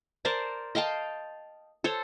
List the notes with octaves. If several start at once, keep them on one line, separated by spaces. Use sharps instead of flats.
A#4 C5 D5 A5
D#5 F5 G5 A5
A4 C5 C#5